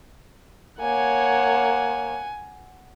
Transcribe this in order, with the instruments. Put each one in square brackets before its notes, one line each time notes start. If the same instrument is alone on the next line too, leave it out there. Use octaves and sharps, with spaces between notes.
[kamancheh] A#3 C#5 [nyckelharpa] F#5 [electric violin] G#5